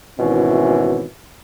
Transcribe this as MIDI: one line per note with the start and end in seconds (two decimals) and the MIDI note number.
0.19 1.03 32
0.19 1.03 47
0.19 1.03 52
0.19 1.03 61
0.19 1.03 64